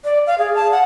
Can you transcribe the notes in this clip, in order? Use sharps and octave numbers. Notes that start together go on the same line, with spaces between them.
D5
F5
G#4
A5
F#5